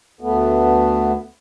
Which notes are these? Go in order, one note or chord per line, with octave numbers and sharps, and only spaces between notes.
D2 A3 B3